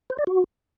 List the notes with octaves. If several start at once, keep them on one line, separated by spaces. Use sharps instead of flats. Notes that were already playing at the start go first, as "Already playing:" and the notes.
C5
D5
F#4